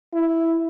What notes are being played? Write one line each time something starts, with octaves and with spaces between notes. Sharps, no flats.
E4